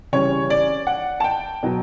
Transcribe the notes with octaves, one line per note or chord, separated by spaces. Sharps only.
C#3 E3 G3 C#5
D5
F#5
A5
G5
B2 F#3